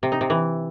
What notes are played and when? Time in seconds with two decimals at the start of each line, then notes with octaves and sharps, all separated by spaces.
0.03 C3
0.12 D#4
0.21 C3
0.30 E3